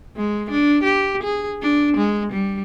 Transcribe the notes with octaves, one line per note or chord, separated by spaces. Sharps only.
G#3
D4
G4
G#4
D4
G#3
G3